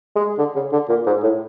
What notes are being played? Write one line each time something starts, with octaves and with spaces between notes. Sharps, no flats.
G#3
D3
C#3
D3
A#2
G#2
A2